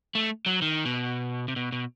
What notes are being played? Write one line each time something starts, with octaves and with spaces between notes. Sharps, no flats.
A3
F#3
D#3
B2
C3
B2
B2